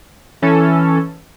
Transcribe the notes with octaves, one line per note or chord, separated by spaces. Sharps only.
E3 C#4 A4